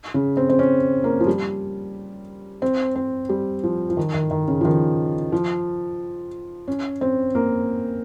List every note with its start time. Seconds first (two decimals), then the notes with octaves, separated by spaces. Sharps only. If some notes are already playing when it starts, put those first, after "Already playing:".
0.14 C#3
0.37 C4
0.49 C4
0.59 C#4
1.04 A#3
1.20 F3
1.27 G3
2.62 C4
2.96 C4
3.29 G3
3.64 F3
3.90 F3
3.97 D#3
4.14 D#3
4.31 D#3
4.48 C#3
4.61 F3
4.65 D#3
5.32 F3
6.68 C#4
7.01 C4
7.35 A#3